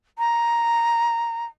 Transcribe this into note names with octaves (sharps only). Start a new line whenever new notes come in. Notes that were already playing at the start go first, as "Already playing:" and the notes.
A#5